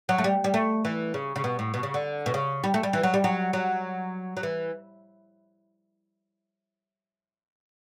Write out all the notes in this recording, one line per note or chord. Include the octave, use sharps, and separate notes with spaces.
F#3
A3
G3
G3
A3
E3
C#3
C#3
B2
A2
B2
C#3
D3
B2
C#3
G3
A3
G3
E3
F#3
G3
F#3
F#3
F#3
E3